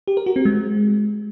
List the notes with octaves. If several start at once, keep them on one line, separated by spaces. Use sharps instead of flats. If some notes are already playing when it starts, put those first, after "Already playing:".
G4
A#4
F#4
C4
G#3